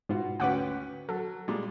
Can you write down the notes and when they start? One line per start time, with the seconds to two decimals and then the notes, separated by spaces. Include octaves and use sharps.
0.09 G#2 B2 F4 F#4
0.40 D2 C#4 B4 F#5 G5 D6
1.09 F#3 A4
1.48 A#2 G3 G#3